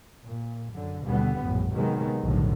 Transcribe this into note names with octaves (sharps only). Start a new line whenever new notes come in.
A#2
F#2 D3
D#2 B2 D3 G3 B3
A#1 F#2 A2
C3 D#3 F#3 G#3 B3
B1 F2 A2 D3 D#3